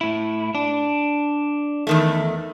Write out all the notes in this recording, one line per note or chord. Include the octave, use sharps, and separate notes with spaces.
A2 E4
D4
E2 D#3 A3